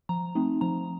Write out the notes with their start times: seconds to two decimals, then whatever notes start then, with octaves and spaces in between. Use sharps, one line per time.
0.09 F3 A#5
0.35 A3 C4 D#4
0.61 F3 A#5